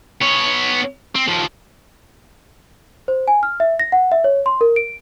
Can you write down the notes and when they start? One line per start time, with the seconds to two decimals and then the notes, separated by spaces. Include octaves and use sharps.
0.22 B3 C#5
1.15 C4
1.28 D#2 F3
3.08 C5
3.28 G#5
3.43 F6
3.60 E5
3.80 A#6
3.92 F#5
4.12 E5
4.24 C#5
4.46 C6
4.61 A#4
4.76 D7